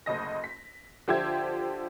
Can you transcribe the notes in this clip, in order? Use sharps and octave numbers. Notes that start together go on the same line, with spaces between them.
F#1 D2 D#5 A#6
B6
D3 F3 G4 C5 E5 G#6